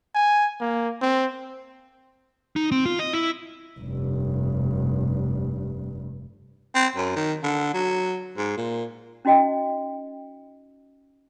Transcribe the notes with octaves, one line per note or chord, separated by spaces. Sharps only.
G#5
A#3
C4
D#4
C4
F4
D#5
E4
F1 G2
C4
F#2
D#3
D3
F#3
G#2
A#2
C#4 D#4 F#4 D#5 G5